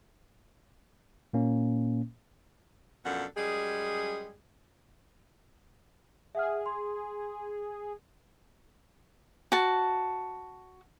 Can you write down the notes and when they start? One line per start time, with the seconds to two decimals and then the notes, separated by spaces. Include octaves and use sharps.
1.33 A#2 A#3 C#4
3.05 F#2 B2 F3 D4 A4 F#5
3.37 F#2 G3 G#3 G#4
6.35 G#4 E5 F#5 F6
6.66 C6
9.52 F#4 A5